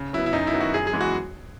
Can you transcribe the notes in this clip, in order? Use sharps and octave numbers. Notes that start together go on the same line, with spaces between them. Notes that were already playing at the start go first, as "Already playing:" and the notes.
Already playing: C#3
F#3 B3 E4
E4
F#2 D#4
E4
D#3 F#3 B3
F#4
F#2 G#4
G#4
E3 G#3 B3
F#4